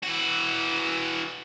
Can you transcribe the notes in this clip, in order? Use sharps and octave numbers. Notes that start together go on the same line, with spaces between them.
E3 F#4